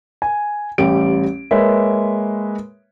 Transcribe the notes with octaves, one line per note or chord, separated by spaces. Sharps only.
G#5
A1 G3 G4 D7
G#3 A#3 B4 C#5 E5